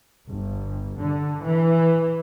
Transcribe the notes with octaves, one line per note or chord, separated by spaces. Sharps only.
G1
D3
E3